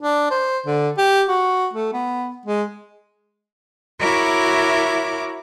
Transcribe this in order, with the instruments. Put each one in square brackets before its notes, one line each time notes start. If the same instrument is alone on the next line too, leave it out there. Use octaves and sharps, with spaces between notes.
[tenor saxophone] D4
C5
D3
G4
F#4
A3
B3
G#3
[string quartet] E4 F#4 A#4 C#5 E5 D6